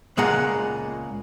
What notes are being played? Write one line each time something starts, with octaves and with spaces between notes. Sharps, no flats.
C#2 A#2 G#3 G#4 F#5 A#5